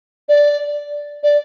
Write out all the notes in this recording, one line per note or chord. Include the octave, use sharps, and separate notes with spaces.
D5
D5